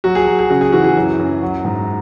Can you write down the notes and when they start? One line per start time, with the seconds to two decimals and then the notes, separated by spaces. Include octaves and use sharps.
0.04 F#3 F#4
0.15 G#4
0.27 F#3
0.39 G#4
0.50 C#3 F#4
0.61 G#4
0.73 E3 F#4
0.84 G#4
0.97 F#2
1.19 F#2
1.43 F#3
1.65 G#2